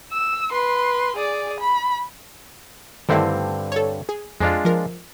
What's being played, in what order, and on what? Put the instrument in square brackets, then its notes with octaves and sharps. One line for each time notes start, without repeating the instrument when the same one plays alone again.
[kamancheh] E6
B4 C6
G#4 D5
B5
[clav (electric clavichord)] G2 D3 C4 [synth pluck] D#3 A3 E4
[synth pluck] A4 C#5
G#4
[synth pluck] F2 [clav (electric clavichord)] G#3 D4 F4
[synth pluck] F3 A#4